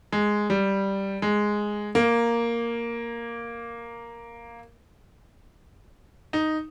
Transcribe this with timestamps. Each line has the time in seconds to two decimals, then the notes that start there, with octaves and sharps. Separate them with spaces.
0.12 G#3
0.50 G3
1.22 G#3
1.95 A#3
6.33 D#4